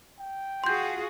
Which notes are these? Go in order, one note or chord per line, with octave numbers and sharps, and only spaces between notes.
G5
F4 F#4 G#4 C6 G6